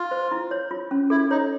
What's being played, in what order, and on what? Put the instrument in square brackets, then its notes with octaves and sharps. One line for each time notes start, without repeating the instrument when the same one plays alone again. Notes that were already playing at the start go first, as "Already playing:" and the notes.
Already playing: [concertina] F4
[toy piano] C5
E4
C#5
F4
C#4
[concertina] E4 [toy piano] A4
[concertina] D#4 [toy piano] C#5